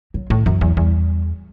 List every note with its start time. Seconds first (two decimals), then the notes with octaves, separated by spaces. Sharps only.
0.14 F#3
0.30 A2 D#3
0.46 F#2 E3
0.61 E2 F#3
0.77 E2 G3